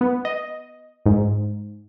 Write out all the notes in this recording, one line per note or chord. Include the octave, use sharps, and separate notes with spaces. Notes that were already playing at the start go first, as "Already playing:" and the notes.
B3
D#5
G#2